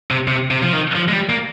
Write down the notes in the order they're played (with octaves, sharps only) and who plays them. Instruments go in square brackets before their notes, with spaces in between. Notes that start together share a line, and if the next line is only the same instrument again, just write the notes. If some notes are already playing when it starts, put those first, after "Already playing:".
[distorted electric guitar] C3
C3
C3
F3
D#3
F3
G#3
G3
A#3